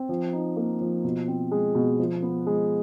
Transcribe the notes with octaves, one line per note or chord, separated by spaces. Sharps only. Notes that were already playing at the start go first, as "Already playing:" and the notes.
Already playing: C4
F3
D#4
A#3
F3
B2
C4
G#3
B2
F3
B3
G#3